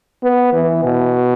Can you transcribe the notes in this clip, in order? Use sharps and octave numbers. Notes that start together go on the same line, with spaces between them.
B3
E3
B2